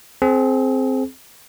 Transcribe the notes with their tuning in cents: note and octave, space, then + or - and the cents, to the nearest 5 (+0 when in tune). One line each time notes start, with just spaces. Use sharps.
C4 +0 G#4 +35